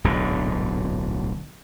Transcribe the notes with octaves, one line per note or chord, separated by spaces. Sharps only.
D1 B1 G#2 D3